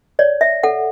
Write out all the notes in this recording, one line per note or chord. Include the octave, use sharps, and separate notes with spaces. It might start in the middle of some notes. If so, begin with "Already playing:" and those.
C#5 D5
E5
A4 F#5